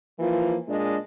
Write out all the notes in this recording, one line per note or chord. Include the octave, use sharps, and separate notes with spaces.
E3 F3 A#3 F4
A#2 G#3 D4 D#5